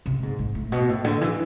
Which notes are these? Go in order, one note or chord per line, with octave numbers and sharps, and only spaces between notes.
C3
G#2
G#2
A2
B2
A2
D3
E3